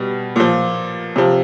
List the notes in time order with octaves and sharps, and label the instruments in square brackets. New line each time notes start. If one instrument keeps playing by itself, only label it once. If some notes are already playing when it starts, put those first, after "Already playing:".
Already playing: [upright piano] B2 G3
A#2 F3
C3 F3